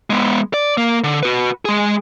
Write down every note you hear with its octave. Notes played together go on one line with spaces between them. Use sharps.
G#3 B3
D5
A#3
D3
F#4 B4
G#3 G#4